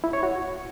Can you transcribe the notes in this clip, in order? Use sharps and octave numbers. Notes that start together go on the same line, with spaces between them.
E4
C#5
F#4